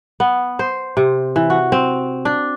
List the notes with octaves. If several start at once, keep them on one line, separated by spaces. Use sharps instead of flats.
B3
C5
C3
E3
F#4
C4
D4